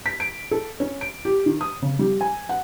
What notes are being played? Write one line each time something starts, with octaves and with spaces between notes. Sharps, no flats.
B6
D7
A4
C#4
D7
G4
D#3
D#6
C#3
G3
G#5
F#5